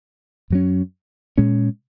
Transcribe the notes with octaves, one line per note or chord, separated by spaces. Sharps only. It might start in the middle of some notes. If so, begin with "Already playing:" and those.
F#2 F#3 C#4
A#2 G#3 C#4